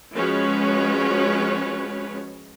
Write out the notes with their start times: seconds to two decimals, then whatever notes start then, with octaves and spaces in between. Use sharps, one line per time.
0.14 F3 G#3 C#4 F#4 B4 C#5